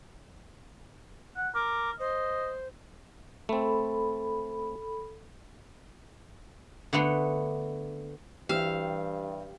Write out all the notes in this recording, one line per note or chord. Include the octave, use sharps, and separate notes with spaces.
F#5
A#4 D6
C5 D#5
A3 C4 A4 B5
D3 A3 B3 C6
G2 E3 G4 C5 F5 E6